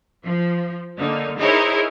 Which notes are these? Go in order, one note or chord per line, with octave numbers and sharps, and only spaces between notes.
F3
D3 A#3 D#4
D#4 E4 G#4 A#4 C5 C#5